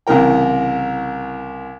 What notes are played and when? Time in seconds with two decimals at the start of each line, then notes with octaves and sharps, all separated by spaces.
0.07 C2 C#3 E3 A#4 G5